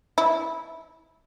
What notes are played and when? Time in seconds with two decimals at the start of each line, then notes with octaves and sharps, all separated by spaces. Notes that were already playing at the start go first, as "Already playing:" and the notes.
0.18 E4